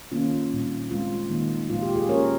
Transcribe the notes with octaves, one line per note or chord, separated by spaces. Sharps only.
D#3 A#3 C#4 F4
A#2 G3 C4 D#4
C#3 G#3 C4 F4
D#3 A#3 D#4
A#2 F3 G#3 F4
G4
F4 G#4
F3 A#3 C#4 A#4 C#5